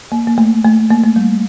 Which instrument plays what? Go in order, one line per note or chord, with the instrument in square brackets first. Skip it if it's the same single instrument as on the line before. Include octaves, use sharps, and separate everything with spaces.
[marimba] A#3
A#3
A3
A3
A#3
A3
G3